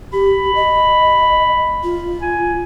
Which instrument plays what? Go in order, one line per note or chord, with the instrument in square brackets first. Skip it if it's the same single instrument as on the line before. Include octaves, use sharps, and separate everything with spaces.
[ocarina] G4 [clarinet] B5
[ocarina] D#5
F4
[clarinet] G#5